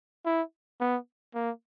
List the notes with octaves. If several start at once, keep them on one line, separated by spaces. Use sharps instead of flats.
E4
B3
A#3